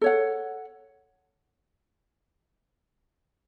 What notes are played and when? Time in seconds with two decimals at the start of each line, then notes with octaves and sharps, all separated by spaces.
0.01 A4 C#5 F#5